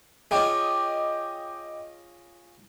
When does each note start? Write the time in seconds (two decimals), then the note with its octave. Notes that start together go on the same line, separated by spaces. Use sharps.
0.31 C#4 F4 G#4 D#5 G5 D6